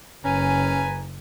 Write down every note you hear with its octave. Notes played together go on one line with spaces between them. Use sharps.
F#1 C#4 B4 G#5 A#5